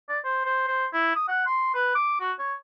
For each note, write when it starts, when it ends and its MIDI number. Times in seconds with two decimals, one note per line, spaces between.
0.09 0.19 74
0.24 0.42 72
0.45 0.66 72
0.68 0.86 72
0.93 1.14 64
1.15 1.24 87
1.28 1.46 78
1.46 1.72 84
1.74 1.90 71
1.95 2.18 86
2.20 2.32 66
2.39 2.54 73